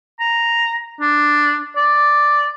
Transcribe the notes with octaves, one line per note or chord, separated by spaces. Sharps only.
A#5
D4
D5